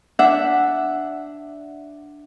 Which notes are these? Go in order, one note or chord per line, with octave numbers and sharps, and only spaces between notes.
D4 E5 F#5